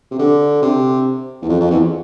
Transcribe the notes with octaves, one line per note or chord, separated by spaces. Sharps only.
C3
D3
C3
E2
F2
F2
E2